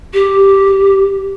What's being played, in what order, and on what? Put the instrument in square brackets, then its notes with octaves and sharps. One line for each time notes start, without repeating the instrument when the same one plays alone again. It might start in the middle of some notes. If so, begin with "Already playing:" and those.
[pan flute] G4